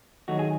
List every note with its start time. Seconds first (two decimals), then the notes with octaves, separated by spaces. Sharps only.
0.28 D#3 F#3 A3 D#4 F#4
0.39 G#4